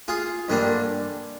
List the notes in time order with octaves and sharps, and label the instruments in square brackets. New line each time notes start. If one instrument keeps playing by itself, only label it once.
[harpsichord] F4 G#4
G2 D3 G3 A#3 D4